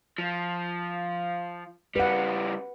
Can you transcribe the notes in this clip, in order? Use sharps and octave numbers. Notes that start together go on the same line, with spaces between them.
F3
C#3 G3 B4 F#5